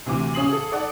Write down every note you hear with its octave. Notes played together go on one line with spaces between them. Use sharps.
D2 C3 E3 D6
C#3 C#4 D#6 C7 F#7
G#4 A4
D#4 A4 D5 F#5